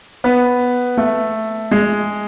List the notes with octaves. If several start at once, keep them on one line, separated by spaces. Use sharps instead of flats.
B3
A3
G#3